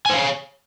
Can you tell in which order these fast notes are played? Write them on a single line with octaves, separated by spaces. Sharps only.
G#5 C5 F5 C#5